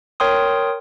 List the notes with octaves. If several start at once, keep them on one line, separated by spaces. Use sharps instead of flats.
A#4 C#5 G5 C6 D#6